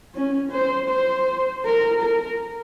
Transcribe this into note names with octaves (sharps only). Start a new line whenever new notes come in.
C#4
C5
C5
A#4
A#4